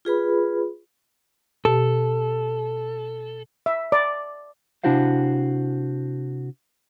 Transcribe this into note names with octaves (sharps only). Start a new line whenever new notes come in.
F4 G#4 B4 B5
B2 G4 A4 A5
E5
D5
C3 D4 E4 F#4 C5 F5